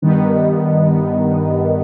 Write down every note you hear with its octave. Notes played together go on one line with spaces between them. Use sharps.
G2 D#3 G3 B3 D#4